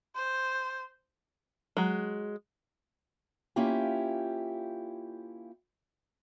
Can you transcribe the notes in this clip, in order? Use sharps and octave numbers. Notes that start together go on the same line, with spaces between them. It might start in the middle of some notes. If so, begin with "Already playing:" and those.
C5
F#3 G#3
A#3 C#4 E4 F4 G4